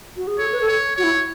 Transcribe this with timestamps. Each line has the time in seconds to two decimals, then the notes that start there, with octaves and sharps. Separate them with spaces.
0.17 F#4
0.27 G#4
0.38 A4 C#5
0.52 B4
0.61 A4
0.68 C#5
0.97 F#4 C#5
1.03 E4